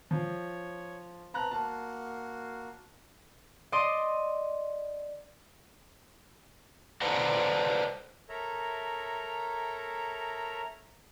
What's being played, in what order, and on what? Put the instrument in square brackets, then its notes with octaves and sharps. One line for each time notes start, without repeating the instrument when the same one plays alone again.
[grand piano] F3 [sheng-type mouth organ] C#5
[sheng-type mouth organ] C4 B4 [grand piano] A5 A#5 F#6
[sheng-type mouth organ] A#3 F#4 [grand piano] A5
[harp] D5 D#5 C6 D#6
[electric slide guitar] A4 B4 C5 D5 F#5 A#5
[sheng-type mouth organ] A4 A#4 C#5 E5 A#5